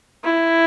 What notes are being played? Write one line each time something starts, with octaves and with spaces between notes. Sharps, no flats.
E4